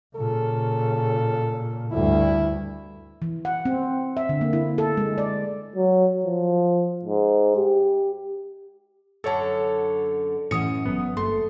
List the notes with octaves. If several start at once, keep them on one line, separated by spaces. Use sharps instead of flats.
A#2 C#3 A4
D2 G2 E4
E3
F#5
C4
E5
D3
A#3
E4
A4
G#3
D5
F#3
F3
G#2
G4
F#2 D3 A4 C#5 A5
F#2 A2 E3 C#4 D#6 C#7
G#1 D3 F#3 B3
G1 A3 A#3 C6